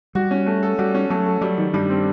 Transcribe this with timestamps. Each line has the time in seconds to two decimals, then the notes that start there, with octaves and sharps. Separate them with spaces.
0.15 G3 F#4
0.31 C#4
0.46 A3
0.63 A4
0.78 G3 F#4
0.94 C#4
1.10 F#3 A3
1.26 A4
1.41 F#3 G3
1.58 D#3
1.74 G2 G3
1.90 C4